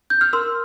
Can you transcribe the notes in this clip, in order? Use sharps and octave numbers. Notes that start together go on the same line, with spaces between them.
G6
F6
A#4 C6 E6